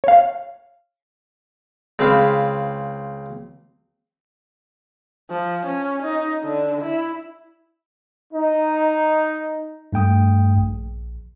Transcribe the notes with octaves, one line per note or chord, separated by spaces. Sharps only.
C#5 F5
C#2 C4 G#4 B4 F5 B5
F3
C#4
D#4
D3
E4
D#4
G2 A3 G5 D#6
A#1